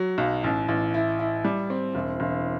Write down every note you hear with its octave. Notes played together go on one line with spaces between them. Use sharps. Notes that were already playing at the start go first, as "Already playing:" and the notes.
Already playing: F#3
B1
A1
A1
E4
E4
G3
C4
E1
E1